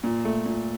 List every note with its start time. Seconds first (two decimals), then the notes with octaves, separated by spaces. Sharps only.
0.04 A#2
0.25 A3
0.46 A#2